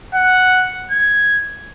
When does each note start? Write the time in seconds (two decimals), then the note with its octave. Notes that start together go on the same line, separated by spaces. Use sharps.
0.15 F#5
0.91 G#6